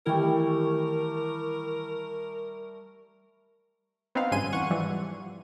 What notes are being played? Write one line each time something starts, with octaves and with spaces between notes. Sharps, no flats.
D#3 E3 G3 A3 E4 A#4
B3 C4 D#4 F5
G#1 G2 C#3 G#5 C6 D#7
E2 F#5 C#6
G#2 E3 F3 G3